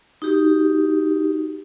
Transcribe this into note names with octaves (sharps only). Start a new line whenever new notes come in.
D#4 F#4 G4